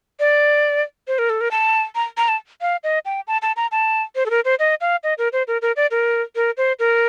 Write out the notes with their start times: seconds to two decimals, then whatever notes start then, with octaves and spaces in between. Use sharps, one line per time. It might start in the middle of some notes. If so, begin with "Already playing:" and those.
0.20 D5
1.08 C5
1.19 A#4
1.30 A4
1.41 A#4
1.51 A5
1.95 A#5
2.17 A#5
2.28 A5
2.61 F5
2.84 D#5
3.05 G5
3.27 A5
3.42 A5
3.57 A#5
3.72 A5
4.15 C5
4.26 A4
4.30 A#4
4.45 C5
4.59 D#5
4.81 F5
5.04 D#5
5.18 A#4
5.33 C5
5.48 A#4
5.62 A#4
5.76 D5
5.91 A#4
6.36 A#4
6.57 C5
6.79 A#4